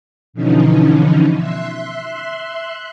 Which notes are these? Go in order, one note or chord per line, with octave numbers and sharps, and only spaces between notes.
B2 D3 E3 F3 C#4 D#4
E5 C6 F#6